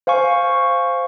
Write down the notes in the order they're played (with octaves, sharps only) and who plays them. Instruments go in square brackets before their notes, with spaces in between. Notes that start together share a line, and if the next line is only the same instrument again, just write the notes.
[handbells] C5 F5 G#5 C#6